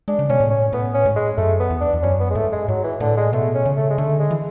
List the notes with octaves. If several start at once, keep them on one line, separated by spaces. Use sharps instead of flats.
G#3 D4
C#3
B2 C#4
A2
C#4
A2 B3
C#4
G#2
G#3
F#2 A3
B3
E2
D4
E2
F#2 C#4
B3
G#3
G#2 A3
G#3
G#2 F#3
E3
A2 D3
G#3
B2 A3
C#4
C#3
A3
G#3
D3 A3
G#3
E3